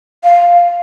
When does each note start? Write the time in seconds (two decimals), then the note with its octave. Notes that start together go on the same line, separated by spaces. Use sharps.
0.24 F5